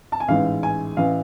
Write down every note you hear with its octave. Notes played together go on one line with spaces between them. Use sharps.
A5
G#5
A1 G#2 E3 F5
G#5
A1 E3 F5